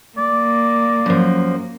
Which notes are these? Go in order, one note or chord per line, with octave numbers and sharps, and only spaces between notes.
A#3 D5
F#2 F3